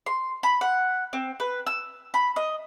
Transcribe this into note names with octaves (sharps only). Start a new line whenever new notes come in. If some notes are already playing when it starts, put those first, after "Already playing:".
C6
B5
F#5
C4
B4
E6
B5
D#5